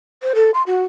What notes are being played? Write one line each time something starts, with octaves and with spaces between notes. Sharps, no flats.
C5
A4
C6
F#4